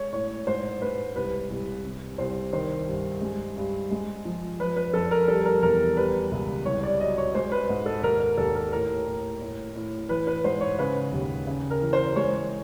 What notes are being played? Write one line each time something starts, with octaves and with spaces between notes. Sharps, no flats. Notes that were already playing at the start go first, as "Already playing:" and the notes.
Already playing: G#3 C#5
A2 C#5
G#2 C5
G#3 B4
C2 B4
C2
C3
C2 C5
D#3 C5
G2
G#3
G2
G#3
F3
F3 B4
B4
F2 A4
A#4
G3 A4
A#4
E2 A#4
G3 B4
C#2
C2 C#5
D5
F#3 D#5
C#5
G#3 C5
B4
G#2
A4
D#2 A#4
A#4
D#2 A4
A#4
A2 A#4
A2
A2
A2
E3 B4
B4
G#2 C5
C#5
C#3 B4
D#2
C#3
A#4
E3
C5
G#3 C#5